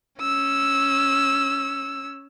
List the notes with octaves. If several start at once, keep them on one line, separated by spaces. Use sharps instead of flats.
C#4 E6